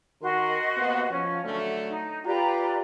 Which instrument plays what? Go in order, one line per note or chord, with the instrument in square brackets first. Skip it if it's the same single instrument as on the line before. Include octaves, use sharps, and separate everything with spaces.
[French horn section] D#3 A#4 [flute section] F#4 D#5 C6
[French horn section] C3 A#3 B3
[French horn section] F3 [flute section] C#4
[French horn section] D3 F#3 A3
[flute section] D#4
[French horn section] F4 G4 [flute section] B4 D5 A#5